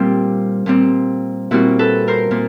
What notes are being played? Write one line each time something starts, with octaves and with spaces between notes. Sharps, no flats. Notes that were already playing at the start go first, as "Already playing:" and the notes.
Already playing: A#2 G3 C4 F4 G4
A#2 G3 C4
A#2 G3 C4 E4 F#4
A4 B4
A#4 C5
A#2